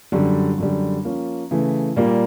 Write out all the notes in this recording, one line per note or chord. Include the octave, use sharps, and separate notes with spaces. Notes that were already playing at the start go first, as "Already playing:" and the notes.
F#2 D3 G3
F#2 D3 G3
F3 A#3 C#4
C#3 E3 A3
A#2 G3 A#3